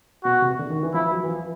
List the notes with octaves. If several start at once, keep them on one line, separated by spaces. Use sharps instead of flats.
B2 F#4
C3
D3
D#3
E3
F3 E4
F#3
E3
F3